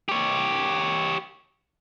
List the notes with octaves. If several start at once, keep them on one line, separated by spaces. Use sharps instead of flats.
G4 C#5